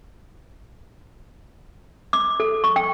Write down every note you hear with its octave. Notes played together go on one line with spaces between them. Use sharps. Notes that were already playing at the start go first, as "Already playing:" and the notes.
D6
A4
C#6
G5